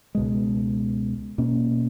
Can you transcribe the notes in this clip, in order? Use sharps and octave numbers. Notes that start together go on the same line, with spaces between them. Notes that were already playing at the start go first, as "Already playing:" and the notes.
C#2 B2 G#3
B2 A#3 C#4